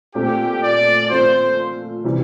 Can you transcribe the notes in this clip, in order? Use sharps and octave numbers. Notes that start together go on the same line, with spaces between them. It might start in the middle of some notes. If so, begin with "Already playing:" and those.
A#2 A3 C4 G4
D5
A#2 F3 A3 C4 F4 C5
C3 E3 G3